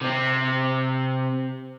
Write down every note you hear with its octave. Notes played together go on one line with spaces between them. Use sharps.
C3 C4